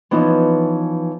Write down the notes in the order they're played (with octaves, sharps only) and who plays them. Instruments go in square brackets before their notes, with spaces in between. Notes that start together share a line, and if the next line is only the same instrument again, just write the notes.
[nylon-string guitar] E3 F3 B3 C#4 D#4